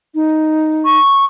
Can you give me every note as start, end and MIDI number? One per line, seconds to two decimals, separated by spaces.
0.15 0.99 63
0.85 1.25 85